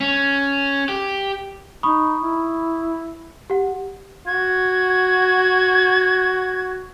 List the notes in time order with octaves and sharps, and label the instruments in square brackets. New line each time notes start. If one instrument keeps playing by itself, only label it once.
[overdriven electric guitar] C#4
G4
[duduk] D#4 [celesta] B5 C#6 D#6
[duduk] E4
[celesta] G4 F#5
[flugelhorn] F#4 [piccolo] G#6